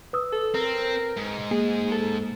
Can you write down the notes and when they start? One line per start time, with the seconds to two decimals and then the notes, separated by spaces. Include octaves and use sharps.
0.13 B4 D#6 E6
0.32 A4
0.54 C4 A#4
1.16 G#2
1.51 A#3 G#4
1.91 A4